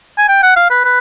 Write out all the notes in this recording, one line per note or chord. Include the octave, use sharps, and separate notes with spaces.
G#5
G5
F#5
F5
B4
B4